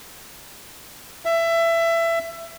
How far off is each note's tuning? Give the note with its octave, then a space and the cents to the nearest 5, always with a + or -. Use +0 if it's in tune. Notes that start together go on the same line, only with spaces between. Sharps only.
E5 +20